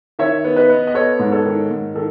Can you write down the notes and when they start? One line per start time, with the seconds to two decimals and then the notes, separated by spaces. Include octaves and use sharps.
0.19 D#3 C#5 E5
0.44 B3
0.56 B4 D#5
0.70 B3
0.87 D#5
0.94 B3 A4 C#5
1.19 G#2
1.32 A4 C#5
1.46 D#3
1.71 G#2
1.95 D#3 A4